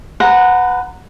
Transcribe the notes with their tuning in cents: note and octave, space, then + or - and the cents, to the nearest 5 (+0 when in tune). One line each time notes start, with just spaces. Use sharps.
B4 +20 F#5 -10 A#5 -10